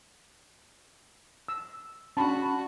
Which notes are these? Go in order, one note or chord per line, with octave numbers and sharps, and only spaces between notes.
E6
C#4 D4 F#4 A5 B5